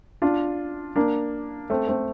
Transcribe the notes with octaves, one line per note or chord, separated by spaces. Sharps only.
D4 F4
A#3 D4
A3 C4
A3 C4